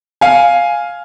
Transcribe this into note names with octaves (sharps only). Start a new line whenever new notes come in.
F5 G#5